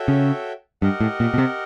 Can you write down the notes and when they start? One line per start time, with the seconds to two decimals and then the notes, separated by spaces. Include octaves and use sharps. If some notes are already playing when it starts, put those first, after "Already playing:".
Already playing: F#4 A4 C#5 E5 G5
0.08 C#3
0.82 G2 G4 A#4 D#5 F#5
1.00 A2
1.20 A#2
1.34 B2
1.38 C3